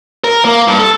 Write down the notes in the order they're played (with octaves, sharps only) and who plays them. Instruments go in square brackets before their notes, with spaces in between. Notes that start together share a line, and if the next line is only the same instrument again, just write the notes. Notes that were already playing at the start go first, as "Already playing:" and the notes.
[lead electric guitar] A#4
A#3
G2
A4